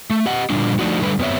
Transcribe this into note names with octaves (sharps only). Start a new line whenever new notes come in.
A3
G4 D#5 F#5
A#2 D3 F3 G3 D4
F3 A3 D4 D#4 F#4
D3 G3 A3 B4
F#2 B3 C4 G4 C#5 E5